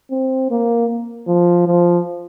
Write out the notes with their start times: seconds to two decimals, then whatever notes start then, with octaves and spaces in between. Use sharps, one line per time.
0.11 C4
0.51 A#3
1.28 F3
1.67 F3